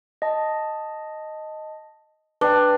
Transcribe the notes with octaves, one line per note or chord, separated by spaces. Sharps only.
D#5 A5
D4 B4 G5